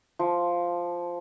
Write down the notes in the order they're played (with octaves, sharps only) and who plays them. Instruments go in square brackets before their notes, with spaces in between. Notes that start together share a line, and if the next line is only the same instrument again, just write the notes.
[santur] F3